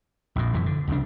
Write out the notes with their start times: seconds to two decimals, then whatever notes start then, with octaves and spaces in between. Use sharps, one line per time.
0.36 A#1 F2 A#2
0.53 F1 F#2 E3
0.66 D3
0.88 C2 F2 C#3 D4